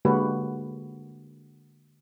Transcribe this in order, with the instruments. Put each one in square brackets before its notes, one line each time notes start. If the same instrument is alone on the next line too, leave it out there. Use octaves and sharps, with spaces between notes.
[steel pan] D3 G#3 A#3 F#4 G4 B4